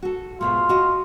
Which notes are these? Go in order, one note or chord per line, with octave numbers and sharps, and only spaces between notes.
F#4 A4
G#2 B2 A3 F4
F#4 D#5